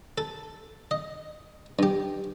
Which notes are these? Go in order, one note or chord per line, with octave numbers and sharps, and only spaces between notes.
A4
D#5
G2 G4